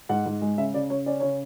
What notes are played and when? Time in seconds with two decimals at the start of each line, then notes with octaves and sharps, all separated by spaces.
0.09 G#2 F#5
0.26 G#2
0.42 G#3
0.58 C#3 E5
0.74 C#3 D5
0.90 C#3 C#5
1.06 C#4 D5
1.20 C#3 C#5